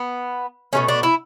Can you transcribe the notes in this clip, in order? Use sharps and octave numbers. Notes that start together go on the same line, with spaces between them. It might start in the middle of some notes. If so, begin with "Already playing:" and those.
Already playing: B3
B2 F#3 A3 C#4
D4
E4